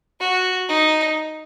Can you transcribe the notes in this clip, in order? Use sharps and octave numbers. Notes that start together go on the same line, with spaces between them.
F#4
D#4